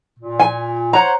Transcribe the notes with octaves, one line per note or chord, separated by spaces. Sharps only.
A#2
G#5
C5 C#5 F#5 A#5